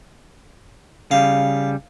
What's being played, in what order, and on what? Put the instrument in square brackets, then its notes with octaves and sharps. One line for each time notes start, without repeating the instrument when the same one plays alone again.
[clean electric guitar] C#3 G3 [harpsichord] F5